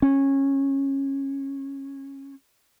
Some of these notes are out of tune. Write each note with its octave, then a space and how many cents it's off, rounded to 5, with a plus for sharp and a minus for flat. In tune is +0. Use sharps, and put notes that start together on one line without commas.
C#4 -15